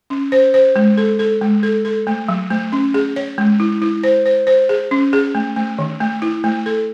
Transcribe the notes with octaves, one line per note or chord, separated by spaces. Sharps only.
C#4
C5
C5
G#3
A4
A4
G#3
A4
A4
A3
F#3
A3
C#4
G#4
C#5
G#3
E4
E4
C5
C5
C5
G#4
C#4
G#4
A3
A3
D#3
A3
E4
A3
A4